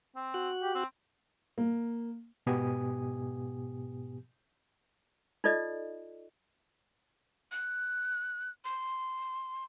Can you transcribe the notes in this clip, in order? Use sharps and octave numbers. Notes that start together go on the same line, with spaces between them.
C4
F#4 F#6
G4
C4
A#3
G#2 B2 B3 G4 G#5 D#6
D#4 F4 A4 D5 D#5
F#6
C6